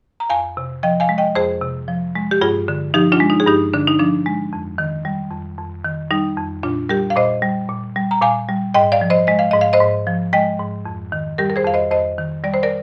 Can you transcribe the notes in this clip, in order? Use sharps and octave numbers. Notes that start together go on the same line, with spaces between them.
A#5
F2 F5 G#5
C3
F3 D#5 G5
F5 G#5
G#3
D#5 G5
F2 G#4 C5
C3
F3
G#3
G4
G2 F4 G#4
D3
F3 D#4 G4
D4 F4
G#3
D#4
G#4
G2 D#4 G4
D3 D4
D#4
F3 D4
G#3
F2
D#3
G3
F2
F2
D#3
G3 D#4
F2
A#2 D4 F4
G3 G4 A#4
F5
A#2 C5 D#5
G3
A#2
G3
A#5
A#2 F5 G#5
G3
G#2 D#5 G5
D5 F5
F3
C5 D#5
G#3 D#5
F5
G#2 D#5
F5
C5 D#5
G#2
F3
G#3 D#5 G5
G#2
F2
D#3
G3 G4 A#4
A#4
G#4 C5
F2 F5
C5 D#5
F2 C5 D#5
D#3
G3 D5
C5
A#4 D5